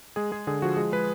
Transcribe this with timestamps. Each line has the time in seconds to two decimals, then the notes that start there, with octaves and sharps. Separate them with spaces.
0.16 G#3 G#4
0.31 G#3 G#4
0.47 D3 G#4
0.62 F3 F#4
0.77 G#3 G#4
0.92 G#3 B4